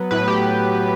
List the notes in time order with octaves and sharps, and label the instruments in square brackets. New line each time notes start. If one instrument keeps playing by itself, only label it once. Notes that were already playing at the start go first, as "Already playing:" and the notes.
Already playing: [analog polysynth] F#3 B3
A2 B4
G4